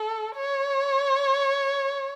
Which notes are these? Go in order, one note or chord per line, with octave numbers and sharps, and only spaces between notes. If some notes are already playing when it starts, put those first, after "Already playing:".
Already playing: A4
C#5